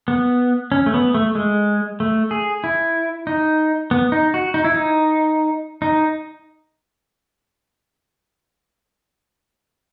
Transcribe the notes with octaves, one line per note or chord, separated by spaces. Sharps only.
B3
C#4
A3
B3
A3
G#3
A3
G#4
E4
D#4
B3
D#4
F#4
D#4
E4
D#4
D#4